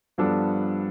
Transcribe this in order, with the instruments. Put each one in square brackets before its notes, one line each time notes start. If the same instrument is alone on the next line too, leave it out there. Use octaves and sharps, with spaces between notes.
[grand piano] G2 F3 B3 D4 A4